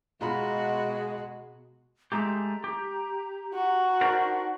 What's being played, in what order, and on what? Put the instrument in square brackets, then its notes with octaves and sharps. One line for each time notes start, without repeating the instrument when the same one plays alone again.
[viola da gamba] B2 F#4 [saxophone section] G#3 [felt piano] F4 A#5 B5
[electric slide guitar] G#3 A3 G4 [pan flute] A#5
[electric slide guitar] G4
[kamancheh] F#4
[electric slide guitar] D4 A#4 C5 [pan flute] D#4